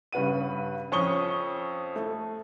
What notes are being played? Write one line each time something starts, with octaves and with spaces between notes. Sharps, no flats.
G2 C#3 B4 F#5 D#7
F2 C#4 C#6 D#6 G7
A3